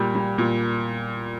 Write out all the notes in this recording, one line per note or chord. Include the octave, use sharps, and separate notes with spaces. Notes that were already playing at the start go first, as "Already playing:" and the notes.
Already playing: A#2 G3
G3
A#2